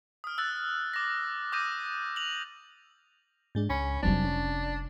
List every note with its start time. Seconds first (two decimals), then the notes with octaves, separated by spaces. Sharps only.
0.24 D#6 F6
0.38 E6 F#6 A6
0.94 D6 A#6
1.52 D6 D#6 G6 A#6 D#7
2.16 F7 F#7
3.55 G#2 G#3 D4
3.69 C#2 C#4 B5
4.03 F1 F#3 G3 C4 D4 D#4
4.25 C#4